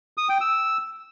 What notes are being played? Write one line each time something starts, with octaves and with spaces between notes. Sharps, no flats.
D#6
G5
E6